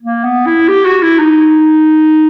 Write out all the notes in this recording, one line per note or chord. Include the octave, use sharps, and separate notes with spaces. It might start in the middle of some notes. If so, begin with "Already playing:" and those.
A#3
B3
E4
G4
F#4
E4
D#4